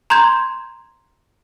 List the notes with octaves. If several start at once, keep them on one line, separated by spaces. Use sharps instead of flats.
A#5 C6 G6 G#6